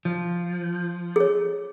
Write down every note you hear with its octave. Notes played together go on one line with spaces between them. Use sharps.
F3
G#4 C#5